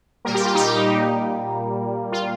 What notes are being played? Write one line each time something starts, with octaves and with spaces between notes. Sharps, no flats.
A#2 G3 A#3 A#4
G4
F4
D#4 G4
F4